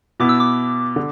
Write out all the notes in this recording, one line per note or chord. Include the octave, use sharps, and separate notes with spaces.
B2 B3 E4 D6
E6
D6
D3